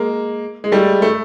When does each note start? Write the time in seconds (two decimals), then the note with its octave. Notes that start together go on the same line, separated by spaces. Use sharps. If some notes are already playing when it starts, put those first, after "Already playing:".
Already playing: G#3 A#3
0.64 G#3
0.72 G3 A3
1.02 A3